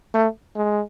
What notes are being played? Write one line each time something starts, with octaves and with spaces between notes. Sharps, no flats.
A3
G#3